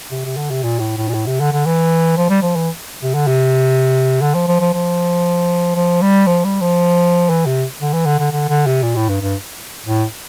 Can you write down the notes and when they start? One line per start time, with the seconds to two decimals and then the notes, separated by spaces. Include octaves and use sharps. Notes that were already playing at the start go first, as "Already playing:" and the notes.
0.11 C3
0.25 C3
0.37 D3
0.50 C3
0.63 A#2
0.79 A2
0.97 A2
1.08 A#2
1.14 A2
1.26 C3
1.40 D3
1.52 D3
1.66 E3
2.17 F3
2.29 G3
2.42 F3
2.56 E3
3.03 C3
3.14 D3
3.27 C3
4.22 D3
4.35 F3
4.47 F3
4.60 F3
4.73 F3
5.75 F3
6.02 G3
6.27 F3
6.44 G3
6.61 F3
7.30 E3
7.46 C3
7.81 D3
7.93 E3
8.06 D3
8.19 D3
8.32 D3
8.49 D3
8.66 C3
8.83 A#2
8.96 A2
9.09 G2
9.22 G2
9.86 A2